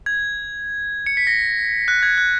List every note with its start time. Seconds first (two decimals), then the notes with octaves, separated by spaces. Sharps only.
0.06 G#6
1.06 C#7
1.17 B6
1.27 A#6
1.88 F#6
2.03 G#6
2.18 F#6